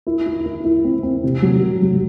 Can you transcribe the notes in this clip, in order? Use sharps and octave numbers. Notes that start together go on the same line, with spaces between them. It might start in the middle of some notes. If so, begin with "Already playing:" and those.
E4
E4
E4
E4
C4
C4
C3
F#3
C3
F#3